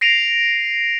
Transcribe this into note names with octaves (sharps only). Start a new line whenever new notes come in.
A#6 C7 D7 D#7 F7